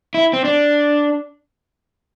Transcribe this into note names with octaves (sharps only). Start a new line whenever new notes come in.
E4
C4
D4